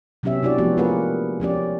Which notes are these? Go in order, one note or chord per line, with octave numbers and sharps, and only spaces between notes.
C3 F#3 B3 C#4 G4 E5
D4 E4 F#4 G4 D5
F3 G#3 A3 B3 F#4 G4
A#3 F4 G#4 A#4 B4 F#5
F3 C#4 G4 D5